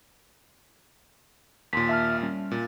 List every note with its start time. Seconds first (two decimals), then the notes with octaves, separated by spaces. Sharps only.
1.73 D#2 A#2 C6 B6
1.89 E5 A5 F6
2.22 G3 C#4
2.51 A#2